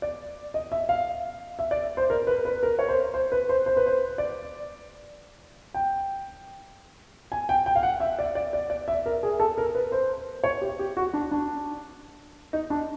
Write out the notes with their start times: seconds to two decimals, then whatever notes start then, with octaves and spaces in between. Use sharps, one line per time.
0.02 D5
0.54 D#5
0.72 E5
0.89 F5
1.59 E5
1.71 D5
1.97 C5
2.10 A#4
2.27 B4
2.45 B4
2.63 A#4
2.79 C#5
2.88 C5
3.14 C5
3.32 B4
3.49 C5
3.66 C5
3.77 B4
3.86 C5
4.18 D5
5.74 G5
7.32 G#5
7.49 G5
7.66 G5
7.76 F5
7.83 F#5
8.00 E5
8.19 D5
8.35 D5
8.53 D5
8.70 D5
8.88 E5
9.06 A#4
9.23 G#4
9.40 A4
9.58 A#4
9.75 B4
9.92 C5
10.44 C#5
10.61 G4
10.79 G4
10.97 F#4
11.14 D4
11.31 D4
12.53 D#4
12.70 D4